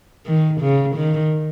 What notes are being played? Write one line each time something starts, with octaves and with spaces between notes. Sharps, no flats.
D#3
C#3
D#3